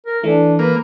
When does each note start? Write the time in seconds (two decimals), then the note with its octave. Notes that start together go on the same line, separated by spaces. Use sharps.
0.06 A#4
0.23 E3 A3 D4
0.59 A#3 B4